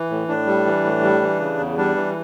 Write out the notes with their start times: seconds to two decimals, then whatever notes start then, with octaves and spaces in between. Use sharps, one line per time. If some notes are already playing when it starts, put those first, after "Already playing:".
Already playing: E3
0.10 A2
0.28 A2 D4
0.47 G3
0.66 E3
0.84 A2
1.02 G3
1.22 E3
1.39 C#3
1.58 E2
1.77 G3 D4
1.96 E3